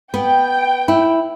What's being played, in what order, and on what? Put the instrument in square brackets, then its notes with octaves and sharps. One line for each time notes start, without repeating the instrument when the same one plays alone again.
[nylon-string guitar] B3 [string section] G5
[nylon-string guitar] E4